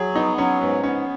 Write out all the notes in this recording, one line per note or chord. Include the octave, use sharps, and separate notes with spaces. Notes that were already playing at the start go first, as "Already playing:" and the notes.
Already playing: F#3 G#4
B3 D#4
F#3 C#4
G#2 B3
B3 C#4